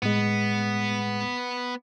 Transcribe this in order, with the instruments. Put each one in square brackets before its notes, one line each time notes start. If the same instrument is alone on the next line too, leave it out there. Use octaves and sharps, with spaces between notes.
[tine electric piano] A2 G#3 [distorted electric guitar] B3